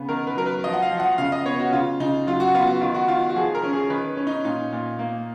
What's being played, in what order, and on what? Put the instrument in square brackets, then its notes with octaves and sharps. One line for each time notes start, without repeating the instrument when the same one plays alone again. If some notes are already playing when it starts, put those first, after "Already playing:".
Already playing: [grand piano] C#3 B3
D#3 A#4
B4
F#3 A#4
B4
F3 D#5
F#5
F5
F3
F#5
C#3 F5
D#5
B3 C#5
F#4
C#3 F4
C#3 D#4
F#3 F4
F#4
B3 F4
F#4
D#3 F4
F#4
D#3 F4
F#4
F3 G#4
A#4
C#4
G#4
D#3 B4
C#4
D#4
A#2 D#4
A#2
A#3